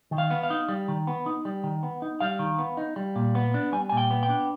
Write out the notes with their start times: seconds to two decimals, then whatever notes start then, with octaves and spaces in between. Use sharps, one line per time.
0.11 D#3
0.18 F5
0.31 B3
0.43 F5
0.50 D#4
0.69 G3
0.88 D#3
1.07 B3
1.26 D#4
1.45 G3
1.64 D#3
1.83 B3
2.02 D#4
2.20 G3 F5
2.39 D#3
2.58 B3
2.77 D#4
2.96 G3
3.16 A#2
3.35 B3
3.54 D4
3.72 G3 G#5
3.89 A#2 G#5
3.97 G5
4.11 B3
4.23 G5
4.29 D4